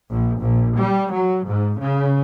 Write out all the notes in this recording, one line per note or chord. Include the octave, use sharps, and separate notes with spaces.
A#1
A#1
G3
F#3
G#2
C#3